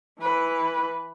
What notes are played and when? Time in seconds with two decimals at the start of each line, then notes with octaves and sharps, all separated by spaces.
0.20 E3 B4